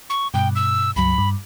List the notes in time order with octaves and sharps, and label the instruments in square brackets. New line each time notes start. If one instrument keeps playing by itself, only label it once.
[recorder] C#6
[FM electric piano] G2 B2 [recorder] G5
[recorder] E6
[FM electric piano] C#2 G2 F#3 [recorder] B5
[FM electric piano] G2